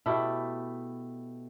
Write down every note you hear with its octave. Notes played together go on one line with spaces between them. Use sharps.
B2 A3 E4 G4